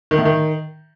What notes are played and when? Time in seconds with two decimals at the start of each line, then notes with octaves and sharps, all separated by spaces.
0.11 D#3
0.18 A2
0.25 D#3